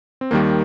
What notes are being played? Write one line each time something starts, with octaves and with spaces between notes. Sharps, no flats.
C4
D#2 D#3 G3 A#3